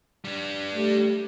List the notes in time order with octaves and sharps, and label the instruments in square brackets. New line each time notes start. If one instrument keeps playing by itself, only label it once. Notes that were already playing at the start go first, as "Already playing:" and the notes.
[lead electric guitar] G3 D4
[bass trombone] A3 [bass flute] G4